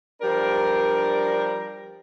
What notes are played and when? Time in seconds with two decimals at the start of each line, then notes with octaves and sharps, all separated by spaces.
0.21 F3 G3 D4 A#4